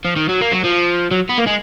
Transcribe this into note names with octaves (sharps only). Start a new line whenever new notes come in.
F3
D#3
F#3
A#3
F#3
F3
F#3
B3
A#3
G#3